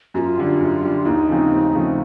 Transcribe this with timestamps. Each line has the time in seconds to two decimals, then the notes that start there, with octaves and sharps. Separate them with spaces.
0.14 F#2 G4
0.18 F4
0.37 D3 G3
0.60 F#2
0.82 D3 G3
1.05 D#2 D#4
1.28 C#3 F3 A3 C4
1.52 D#2
1.74 C#3 F3 A3 C4